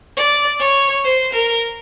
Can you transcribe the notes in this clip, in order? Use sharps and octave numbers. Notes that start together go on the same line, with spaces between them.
D5
C#5
C5
A#4